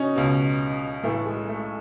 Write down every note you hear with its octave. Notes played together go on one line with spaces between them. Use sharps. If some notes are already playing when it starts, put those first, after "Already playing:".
Already playing: C#4 D#4 F#4
C#2 B2
B1 A2 E3 A3
G#3
A3